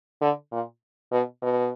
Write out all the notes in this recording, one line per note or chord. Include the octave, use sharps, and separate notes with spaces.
D3
A#2
B2
B2